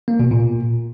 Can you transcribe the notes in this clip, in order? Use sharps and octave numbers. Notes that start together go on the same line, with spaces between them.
A#3
B2
A#2